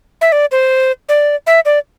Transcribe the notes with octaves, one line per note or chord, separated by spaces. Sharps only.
E5
D5
C5
D5
E5
D5